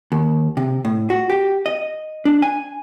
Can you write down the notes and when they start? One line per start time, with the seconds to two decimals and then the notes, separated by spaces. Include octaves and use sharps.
0.12 D#2
0.57 C3
0.85 A2
1.10 F#4
1.30 G4
1.66 D#5
2.25 D4
2.42 G#5